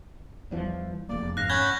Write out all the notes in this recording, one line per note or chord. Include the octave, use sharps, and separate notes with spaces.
E2 E3 F3 G3
F1 E2 A#3 D5
G#2 F5 F#6 A#6
C#4 F#5 B5 G6 G#6 G7